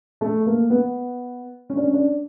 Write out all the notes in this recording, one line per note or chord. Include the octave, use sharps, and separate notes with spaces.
A3
A#3
B3
C#4
D4
C#4
D4